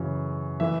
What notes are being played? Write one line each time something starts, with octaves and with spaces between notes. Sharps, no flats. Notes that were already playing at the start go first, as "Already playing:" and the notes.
Already playing: F#2 C#3 E3
E3 E5